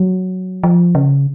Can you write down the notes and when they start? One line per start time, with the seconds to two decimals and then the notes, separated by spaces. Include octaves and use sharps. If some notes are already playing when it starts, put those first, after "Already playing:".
Already playing: F#3
0.63 F3
0.95 C#3